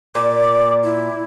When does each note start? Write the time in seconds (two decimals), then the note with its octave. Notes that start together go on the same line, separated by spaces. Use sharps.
0.15 A#2 D6
0.84 E4